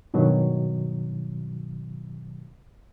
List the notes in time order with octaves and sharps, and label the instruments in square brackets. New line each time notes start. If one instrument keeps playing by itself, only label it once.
[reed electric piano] G2 B2 D#3 F#3